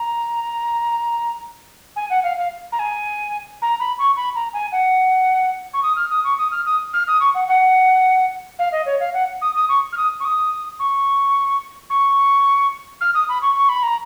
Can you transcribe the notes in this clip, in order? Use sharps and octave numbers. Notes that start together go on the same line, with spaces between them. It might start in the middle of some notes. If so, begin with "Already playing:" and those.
Already playing: A#5
G#5
F#5
F5
F5
A#5
G#5
A#5
B5
C#6
B5
A#5
G#5
F#5
C#6
D#6
F6
D#6
C#6
D#6
F6
D#6
F6
D#6
C#6
F#5
F#5
F5
D#5
C#5
F5
F#5
D#6
D#6
C#6
F6
D#6
C#6
D#6
C#6
C#6
F6
D#6
B5
C#6
C#6
B5
A#5